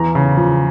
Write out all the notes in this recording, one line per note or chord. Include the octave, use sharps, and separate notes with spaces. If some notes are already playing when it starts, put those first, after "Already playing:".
Already playing: E2 A#5
C#3
F3